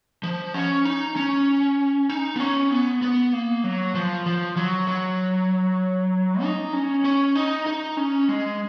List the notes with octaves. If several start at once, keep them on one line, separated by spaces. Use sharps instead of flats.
F3
C#4
D#4
C#4
D#4
B3
C#4
B3
B3
A#3
F#3
F3
F3
F#3
F#3
D#4
C#4
C#4
D#4
D#4
C#4
G#3